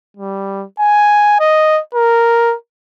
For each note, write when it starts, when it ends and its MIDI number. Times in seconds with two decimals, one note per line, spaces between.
0.17 0.65 55
0.79 1.37 80
1.40 1.80 75
1.95 2.55 70